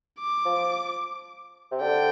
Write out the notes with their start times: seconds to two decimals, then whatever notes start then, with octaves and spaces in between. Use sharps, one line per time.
0.19 D6
0.45 F3
1.71 C3
1.81 D3 G5